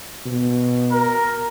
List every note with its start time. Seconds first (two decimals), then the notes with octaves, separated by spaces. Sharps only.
0.26 B2
0.92 A#4